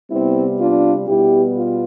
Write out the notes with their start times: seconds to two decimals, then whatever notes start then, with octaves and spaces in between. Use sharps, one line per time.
0.11 C3 G3 B3 C4 E4
0.60 D4 F4
1.08 B2 G3 B3 E4 G4
1.56 F4